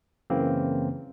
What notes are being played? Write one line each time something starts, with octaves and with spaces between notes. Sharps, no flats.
F#2 C#3 E3 A#3 C4